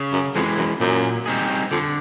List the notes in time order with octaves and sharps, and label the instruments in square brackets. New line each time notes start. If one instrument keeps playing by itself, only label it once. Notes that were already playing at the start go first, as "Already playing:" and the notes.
Already playing: [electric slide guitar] C#3
[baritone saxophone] F#2
[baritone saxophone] F2 [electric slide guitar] E3 G#3
[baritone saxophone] F#2
[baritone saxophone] F#2 [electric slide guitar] A#2
[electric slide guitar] G3 C4 D#4 G#4
[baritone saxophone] F2 [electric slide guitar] D3